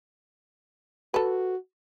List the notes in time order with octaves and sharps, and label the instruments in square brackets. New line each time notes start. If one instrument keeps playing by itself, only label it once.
[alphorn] F#4 [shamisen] A4 B4